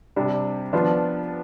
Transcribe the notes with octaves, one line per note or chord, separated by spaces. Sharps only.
C3 G3 D4
F3 B3 D4 F4